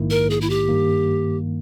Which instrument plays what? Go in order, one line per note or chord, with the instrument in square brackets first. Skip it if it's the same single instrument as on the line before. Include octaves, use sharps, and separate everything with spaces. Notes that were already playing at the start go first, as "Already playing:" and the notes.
Already playing: [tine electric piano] A#1 G#2 D#3 A#3 E4
[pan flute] A#4
G#4
E4
G4
[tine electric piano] G2 D#3 A#3